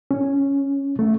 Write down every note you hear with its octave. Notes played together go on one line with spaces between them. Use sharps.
C#4
A3